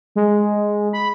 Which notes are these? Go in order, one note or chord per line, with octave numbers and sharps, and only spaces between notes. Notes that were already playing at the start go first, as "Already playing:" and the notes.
G#3
B5